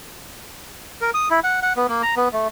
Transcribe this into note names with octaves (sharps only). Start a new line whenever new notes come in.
A#4
D#6
E4
F#5
F#5
B3
A#3
A#5
B3
A3